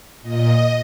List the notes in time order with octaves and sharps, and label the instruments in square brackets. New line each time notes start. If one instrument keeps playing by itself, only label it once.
[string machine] A#2 D#5